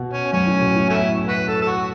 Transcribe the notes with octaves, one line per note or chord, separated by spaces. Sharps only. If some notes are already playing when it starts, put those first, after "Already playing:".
Already playing: B2
C#4
F#2 C#4
A2
B2
A2
A3 C#4 E4
F#4 B4
A4
A4
F#4